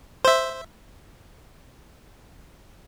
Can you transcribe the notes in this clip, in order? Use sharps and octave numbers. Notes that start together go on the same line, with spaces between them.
C5 E5